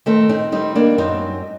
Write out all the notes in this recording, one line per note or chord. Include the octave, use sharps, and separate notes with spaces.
D#3 A3 C4
C4 D#4
G3 C4 D#4
A#3 D4
F#2 C4 D#4